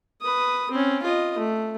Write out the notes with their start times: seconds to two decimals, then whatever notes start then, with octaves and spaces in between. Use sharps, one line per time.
0.22 B4 D#6
0.71 C4 C#4
1.03 F4 D#5
1.38 A3